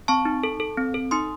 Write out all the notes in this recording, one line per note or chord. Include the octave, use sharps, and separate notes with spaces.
C4 A5 C#6
D#4
A4
A4
C4
A4
D#4 C6 D#6